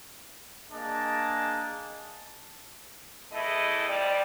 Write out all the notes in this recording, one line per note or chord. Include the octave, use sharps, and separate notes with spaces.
A#3 D4 G#4 D#5 A5
E2 A3 E4 D#5
F2 G3 D5